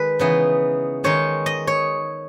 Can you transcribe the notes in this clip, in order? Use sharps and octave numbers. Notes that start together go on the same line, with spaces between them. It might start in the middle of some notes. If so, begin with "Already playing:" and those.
Already playing: D#3 G#3 B4
C#3 E3 B3 D#4
D#3 G#3 D#4 C#5
D#5
C#5